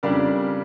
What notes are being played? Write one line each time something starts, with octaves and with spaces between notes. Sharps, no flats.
F2 C#3 G3 D4 A#4 D5